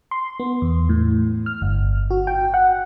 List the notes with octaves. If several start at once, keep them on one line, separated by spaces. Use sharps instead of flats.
C6
B3
E2
A2
F6
G1
F#4
G5
F#5